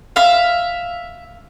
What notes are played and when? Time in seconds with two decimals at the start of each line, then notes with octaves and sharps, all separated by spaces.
0.16 E5 F5